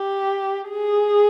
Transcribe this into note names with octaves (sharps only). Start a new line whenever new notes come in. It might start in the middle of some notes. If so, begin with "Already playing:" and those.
Already playing: G4
G#4